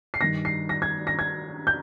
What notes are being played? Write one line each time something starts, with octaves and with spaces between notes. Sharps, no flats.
C7
G2 D#3 A#6
C7
A#6
G#6
A#6
G#6
G6